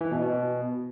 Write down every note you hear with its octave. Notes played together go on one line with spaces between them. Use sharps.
E3
B2
B2